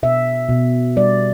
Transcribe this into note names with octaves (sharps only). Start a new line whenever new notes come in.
B2 E5
B2
G3 D5